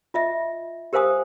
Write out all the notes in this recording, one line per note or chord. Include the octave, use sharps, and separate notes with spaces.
F4 D#5 E5
G4 A#4 C5 F5 G#5 D#6